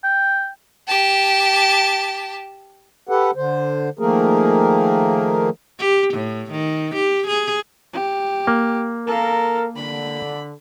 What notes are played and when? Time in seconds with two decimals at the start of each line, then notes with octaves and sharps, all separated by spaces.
0.04 G5
0.88 G4 A5
3.09 G4 A4 B4 F#5
3.36 D3 C5
3.99 D#3 F3 A3 A#3 G#4 A#4
5.79 G4
6.14 A2
6.52 D#3
6.95 G4
7.27 G#4
7.93 G4
8.47 A#3
9.07 A4 A#4 F5
9.76 D3 B5